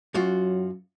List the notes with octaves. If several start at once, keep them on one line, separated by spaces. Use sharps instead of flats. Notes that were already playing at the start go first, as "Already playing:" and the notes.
F#2 F#3 F4 F#4